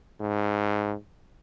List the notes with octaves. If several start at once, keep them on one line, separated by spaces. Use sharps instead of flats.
G#2